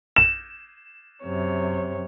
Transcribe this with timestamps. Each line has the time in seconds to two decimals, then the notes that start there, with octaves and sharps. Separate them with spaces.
0.16 E7
1.24 F#2 C3 C#5